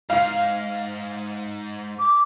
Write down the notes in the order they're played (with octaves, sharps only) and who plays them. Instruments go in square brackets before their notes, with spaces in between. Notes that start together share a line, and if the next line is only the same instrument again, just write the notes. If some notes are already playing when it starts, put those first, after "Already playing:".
[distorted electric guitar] G#2 [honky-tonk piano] F5
[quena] D6